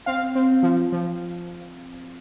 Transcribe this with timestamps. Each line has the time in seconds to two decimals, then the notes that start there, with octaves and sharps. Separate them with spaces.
0.06 C4 F5
0.35 C4
0.63 F3
0.92 F3